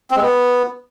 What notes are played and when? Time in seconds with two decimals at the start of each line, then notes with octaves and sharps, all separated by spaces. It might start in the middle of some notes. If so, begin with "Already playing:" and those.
0.11 C4
0.16 G#3
0.22 B3